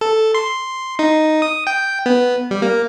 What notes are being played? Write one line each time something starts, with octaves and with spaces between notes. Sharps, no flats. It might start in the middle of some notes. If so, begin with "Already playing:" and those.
A4
C6
D#4
D#6
G5
B3
G3
A#3